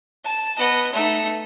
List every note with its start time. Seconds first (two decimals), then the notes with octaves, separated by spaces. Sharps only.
0.25 A5
0.58 B3 D#5
0.93 A3 D#4